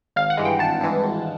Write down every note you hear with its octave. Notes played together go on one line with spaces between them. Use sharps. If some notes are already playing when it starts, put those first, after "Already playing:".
G#1 F5
F#5
G2 E3 G#3
G5
G#1 A5
G2 E3 G#3
G#1